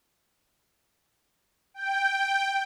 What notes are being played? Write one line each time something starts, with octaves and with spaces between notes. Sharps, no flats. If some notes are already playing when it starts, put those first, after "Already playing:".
G5